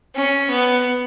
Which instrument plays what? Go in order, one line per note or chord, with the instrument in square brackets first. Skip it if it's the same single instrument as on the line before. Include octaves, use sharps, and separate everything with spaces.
[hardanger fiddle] C#4
B3